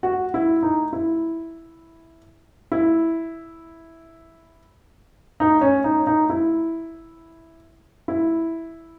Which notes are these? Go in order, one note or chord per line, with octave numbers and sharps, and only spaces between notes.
F#4
E4
D#4
E4
E4
D#4
C#4
D#4
D#4
E4
E4